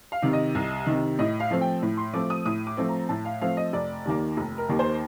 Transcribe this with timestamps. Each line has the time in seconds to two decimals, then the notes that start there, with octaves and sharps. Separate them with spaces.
0.12 F5
0.22 C3 D#3
0.33 D#5
0.55 C2
0.87 C3 D#3
1.19 A2 D#5
1.40 F5
1.51 F3 A3 C4
1.61 G5
1.82 A2
1.97 C6
2.13 F3 A3 C4 D6
2.30 D#6
2.45 A2 D#6
2.67 D6
2.77 F3 A3 C4
2.89 A#5
3.09 A2 A5
3.25 F5
3.41 F3 A3 C4 F5
3.57 D#5
3.73 F1 D5
4.05 D#2 D#3 A#3
4.37 F1
4.58 A#4
4.69 D#2 D#3 A#3
4.79 C5